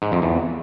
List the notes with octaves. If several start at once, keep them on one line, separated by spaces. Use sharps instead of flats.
G#2
F2
E2